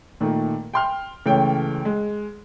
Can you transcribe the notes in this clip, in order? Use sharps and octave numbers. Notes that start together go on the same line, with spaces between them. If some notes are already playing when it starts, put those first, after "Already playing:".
A#2 D#3 A3
G5 C6 F6
C#2 E3 A3 C#5 G5
G#3